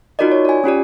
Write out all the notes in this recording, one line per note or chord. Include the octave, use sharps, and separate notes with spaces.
D#4 F4 F#4 A#4 D5 D#5
C#5
D5 G#5
C#4 F4 G4 D5